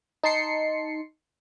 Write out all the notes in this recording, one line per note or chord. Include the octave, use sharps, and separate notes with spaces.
D#4 A5 C6 C7 C#7